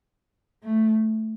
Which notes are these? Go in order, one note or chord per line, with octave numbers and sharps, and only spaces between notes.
A3